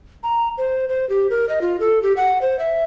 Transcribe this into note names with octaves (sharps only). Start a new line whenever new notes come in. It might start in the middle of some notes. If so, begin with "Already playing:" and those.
A#5
C5
C5
G4
A#4
D#5
F4
A4
G4
F#5
C5
E5